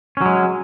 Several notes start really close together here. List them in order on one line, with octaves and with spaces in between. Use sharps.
C#4 F#3 G#3